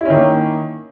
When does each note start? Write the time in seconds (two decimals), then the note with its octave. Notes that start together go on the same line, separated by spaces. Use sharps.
0.01 E4
0.05 C#4
0.10 D#3
0.15 A#3